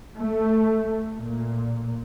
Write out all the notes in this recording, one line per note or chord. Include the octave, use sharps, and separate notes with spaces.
A3
A#2